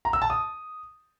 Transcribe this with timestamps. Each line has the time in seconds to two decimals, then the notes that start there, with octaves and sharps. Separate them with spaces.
0.05 A#5
0.13 E6
0.22 A5
0.30 D#6